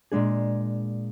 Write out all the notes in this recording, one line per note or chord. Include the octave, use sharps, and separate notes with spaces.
A#2 G#3 D4 G#4